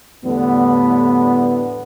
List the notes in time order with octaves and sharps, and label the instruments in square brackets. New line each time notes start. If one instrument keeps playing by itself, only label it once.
[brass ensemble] E2 A2 D3 G3 A3 B3